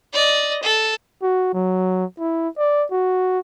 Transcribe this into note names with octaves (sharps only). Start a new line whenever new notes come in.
D5 D#5
A4
F#4
F#3
E4
D5
F#4